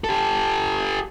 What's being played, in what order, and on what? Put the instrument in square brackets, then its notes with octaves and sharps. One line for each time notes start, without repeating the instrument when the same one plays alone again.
[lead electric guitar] G4 A4